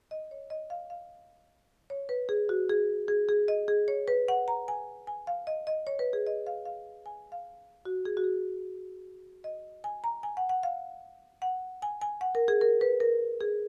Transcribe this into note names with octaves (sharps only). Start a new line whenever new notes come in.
D#5
C#5
D#5
F5
F5
C#5
B4
G#4
F#4
G#4
G#4
G#4
D#5
G#4
C#5
B4
F#5
A#5
G#5
G#5
F5
D#5
D#5
C#5
B4
G#4
D#5
F5
F5
G#5
F5
F#4
G#4
F#4
G#4
D#5
G#5
A#5
G#5
F#5
F#5
F5
F#5
G#5
G#5
F#5
A#4
G#4
A#4
B4
A#4
G#4